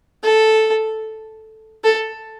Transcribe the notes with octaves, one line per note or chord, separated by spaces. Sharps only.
A4
A4